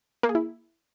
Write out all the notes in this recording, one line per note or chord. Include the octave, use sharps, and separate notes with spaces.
A#3
G#4
E4